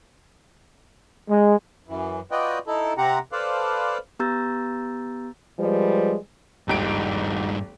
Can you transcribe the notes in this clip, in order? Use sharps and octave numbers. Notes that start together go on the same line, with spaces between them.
G#3
F#2 E3
F4 F#4 B4 D5 D#5 G5
D#4 E4 A4
C3 C4 G4 F#5 A#5
A4 B4 C5 D5 F5
B3 G4 A#5 E6 G6 A6
F3 G3 G#3 B4
D#1 G#1 G2 D#4 D7